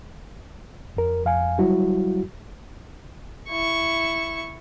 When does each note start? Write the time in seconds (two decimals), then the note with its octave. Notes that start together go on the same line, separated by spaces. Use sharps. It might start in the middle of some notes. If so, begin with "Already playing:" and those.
0.97 F2 A#4
1.25 F2 F5 G#5
1.58 F#3 G3 E4 F#4
3.49 E4 C#6